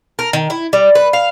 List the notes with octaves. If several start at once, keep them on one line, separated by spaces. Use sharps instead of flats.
A#4
D#3
E4
G3
B4
F5